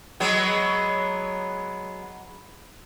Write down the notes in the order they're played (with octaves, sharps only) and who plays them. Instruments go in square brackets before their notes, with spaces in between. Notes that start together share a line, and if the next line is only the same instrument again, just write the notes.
[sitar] F#3 G#3 B3